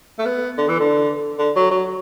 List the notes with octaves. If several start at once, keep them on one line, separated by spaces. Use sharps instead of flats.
A3
B3
D3
E3
D3
D3
F#3
F#3